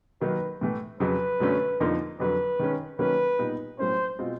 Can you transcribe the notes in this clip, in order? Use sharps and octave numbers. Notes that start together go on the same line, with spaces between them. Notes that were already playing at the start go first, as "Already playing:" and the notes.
D#3 F#3 A#3 D#4 B4
A2 E3 A3
F2 C#3 F#3 B4
F#2 D3 F#3 A3 C#4
F2 D3 F3 A#3 D#4
F2 D3 F#3 B4
D#3 G#3 C#4
D#3 F#3 A#3 C#4 B4
A#2 G3 B3 D#4
A2 F#3 A#3 C#4 E4 C5
B2 G#3 C4 F4